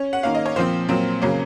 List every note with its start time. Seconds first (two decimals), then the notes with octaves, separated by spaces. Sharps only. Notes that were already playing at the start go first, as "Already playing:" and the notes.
Already playing: C#4 C#5
0.13 F#5
0.23 D#3 A#3 C#4 F5
0.35 D#5
0.46 C#5
0.56 A#2 F3 C4 C5
0.89 A#2 F#3 C4
1.22 C#3 F#3 A#3 C#4